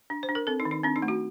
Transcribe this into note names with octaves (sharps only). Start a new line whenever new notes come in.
D4
C5
D4
A#4
C4 A4
D#4
D#3
D#4
C4 D4
D#4
A3
F#4